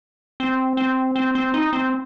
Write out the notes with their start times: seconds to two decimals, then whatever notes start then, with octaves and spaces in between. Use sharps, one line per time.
0.40 C4
0.77 C4
1.16 C4
1.35 C4
1.54 D#4
1.73 C4